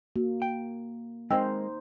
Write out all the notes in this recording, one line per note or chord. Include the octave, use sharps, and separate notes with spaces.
A#3 F#4
G5
G#3 A#3 C4 D#4 C5 D#5 G5 E6